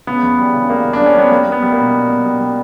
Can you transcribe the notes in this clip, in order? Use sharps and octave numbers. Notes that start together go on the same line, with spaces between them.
C#3 B3
E2
G3
C#3
G3 A#3
C#3
D4
G3
C#4
G3 B3
G3 A#3
G3
B3
G3
A#3
B2
G3
B2
G3
G3